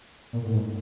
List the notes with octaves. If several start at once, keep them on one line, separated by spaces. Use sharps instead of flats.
A#2
A2
G#2